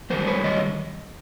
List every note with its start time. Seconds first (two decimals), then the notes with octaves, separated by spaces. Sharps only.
0.10 F#2 D#3 G3 A#4 C5
0.27 B4 C#5
0.44 C#5 D#5